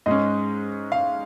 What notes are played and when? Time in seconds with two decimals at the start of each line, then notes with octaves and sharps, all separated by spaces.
0.06 G#2 G#3 C#4 D#5
0.92 F5